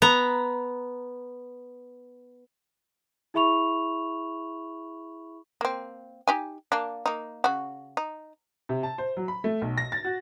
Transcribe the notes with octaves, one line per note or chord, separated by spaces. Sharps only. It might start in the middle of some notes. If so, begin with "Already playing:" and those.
B3 A#5
E4 G#4 E5 B5 C#6 F7
A#3 C4
D#4 G4 G#5
A#3 D4
A#3 D#4
C#3 F#4
D#4
C3
A5
C5
F#3
B5
A3
B1
A#6
A6
F#4